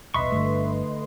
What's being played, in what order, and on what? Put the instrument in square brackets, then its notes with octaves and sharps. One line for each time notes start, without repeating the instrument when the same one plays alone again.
[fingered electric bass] D#1 B1 [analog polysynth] B4 D#5 C6 [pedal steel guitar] E5 C#6
[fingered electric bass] G1 G2 [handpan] D3 A3